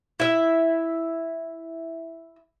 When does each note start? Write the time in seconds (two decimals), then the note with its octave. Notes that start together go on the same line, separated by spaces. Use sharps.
0.20 E4 E5